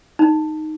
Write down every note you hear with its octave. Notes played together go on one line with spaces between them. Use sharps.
D#4